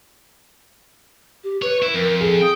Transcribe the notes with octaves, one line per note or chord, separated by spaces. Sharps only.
G4
B4 C#5
E4
F2 A#4
G#4 A4
G5 D#6